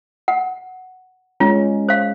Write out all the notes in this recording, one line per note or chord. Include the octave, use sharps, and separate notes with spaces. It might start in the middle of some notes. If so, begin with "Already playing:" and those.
F#5
G#3 C#4 F4
C5 F5